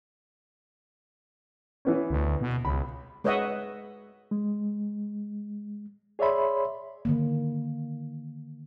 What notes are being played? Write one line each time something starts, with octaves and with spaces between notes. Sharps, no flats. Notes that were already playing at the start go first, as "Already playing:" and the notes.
E3 B3 C#4
D2
B2
C#2 B5
G#3 B4 C#5 D#5 E5 F#5
G#3
G#4 C#5 D5 E5 B5 C6
D3 D#3 A#3